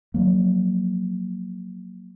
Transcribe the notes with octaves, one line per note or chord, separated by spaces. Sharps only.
F3 F#3 A#3